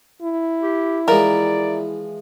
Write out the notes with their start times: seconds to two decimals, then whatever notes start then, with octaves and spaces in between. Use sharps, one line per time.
0.22 E4
0.62 G4
1.08 E3 F3 G#3 A#4 D5